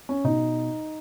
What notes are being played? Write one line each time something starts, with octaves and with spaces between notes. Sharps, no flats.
C#4
B2 D#4